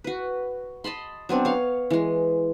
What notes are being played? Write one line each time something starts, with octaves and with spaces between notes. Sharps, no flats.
F#4 B4
D#5 A5 B5 C6
F#3 B3 C4 D4
C#5 F5
E3 G#3